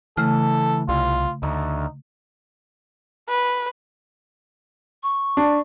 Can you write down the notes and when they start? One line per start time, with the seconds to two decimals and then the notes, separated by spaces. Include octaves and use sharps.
0.17 C#3 E3 A3 A4 F6
0.89 C2 F4
1.43 D2 D#4
3.29 B4
5.03 C#6
5.37 D4